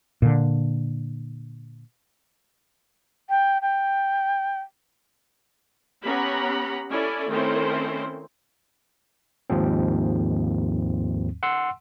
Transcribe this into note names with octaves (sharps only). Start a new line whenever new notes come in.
A#2 D3
G5
G5
B3 C#4 G4 F#5 A#5 B5
C#4 E4 A4 D5 G#5
D#3 A3 C4 C#4 E4 C5
D#2 G#2 F3 C4
F#5 C6 E6